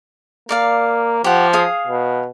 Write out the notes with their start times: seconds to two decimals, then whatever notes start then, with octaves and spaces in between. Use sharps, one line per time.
0.49 A#3 A#4 D5 F5
1.24 F3 G4 F#5
1.53 G#4 F5 D#6
1.87 B2